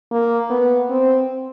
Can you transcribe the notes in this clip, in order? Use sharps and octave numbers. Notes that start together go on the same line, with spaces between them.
A#3
B3
C4